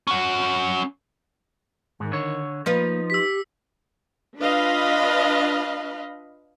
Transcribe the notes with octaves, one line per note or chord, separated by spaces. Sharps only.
C#4 F#5
G#2 D#3
D3 C#5
F3 A#3 D#4 F4 B4
G4 E6 B6
D4 F4 B4 D#5 F5 B5